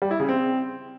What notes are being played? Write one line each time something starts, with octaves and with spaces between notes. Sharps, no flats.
G3
E4
C#3
C4